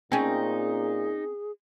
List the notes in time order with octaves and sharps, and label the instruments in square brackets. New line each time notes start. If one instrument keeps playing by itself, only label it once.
[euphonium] A#2 [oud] C4 C#4 [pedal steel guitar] D#4 [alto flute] G#4